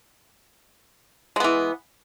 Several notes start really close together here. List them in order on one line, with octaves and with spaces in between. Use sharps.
G#3 B3 E3